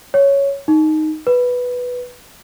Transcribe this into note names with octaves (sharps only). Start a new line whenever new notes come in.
C#5
D#4
B4